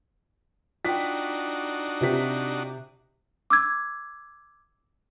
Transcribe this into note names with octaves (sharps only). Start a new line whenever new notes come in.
D4 D#4 F4 F#4 G5 B6
C3 G4 B6
D6 E6 G#6